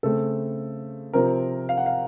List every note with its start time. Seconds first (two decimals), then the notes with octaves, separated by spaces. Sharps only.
0.03 C#3 A3 C4 A4
1.13 C3 F3 C4 A#4
1.69 F5
1.77 F#5
1.86 F5